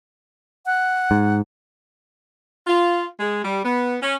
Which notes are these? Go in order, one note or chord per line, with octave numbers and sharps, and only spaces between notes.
F#5
G#2
F4
G#3
G3
B3
C#4